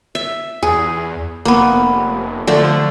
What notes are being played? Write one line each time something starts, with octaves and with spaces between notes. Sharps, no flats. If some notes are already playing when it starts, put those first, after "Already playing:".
E5
E2 G#4
F1 A#3 B3
D3 F3 A3 D4